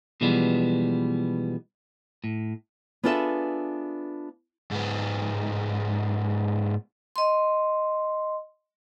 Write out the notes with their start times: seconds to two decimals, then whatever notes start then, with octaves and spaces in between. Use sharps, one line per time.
0.21 B2 E3 F3 G3 G#3 B3
2.24 A2
3.03 B3 D4 F4 G#4 A4 E5
4.72 G#2 B3
7.16 D#5 C6